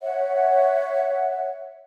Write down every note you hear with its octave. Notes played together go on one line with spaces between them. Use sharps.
C#5 E5 F#5